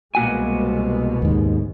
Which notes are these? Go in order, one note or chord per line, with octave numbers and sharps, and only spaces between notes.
C2 B2 G#3 A#3 F#4 G#5
D#2 G#2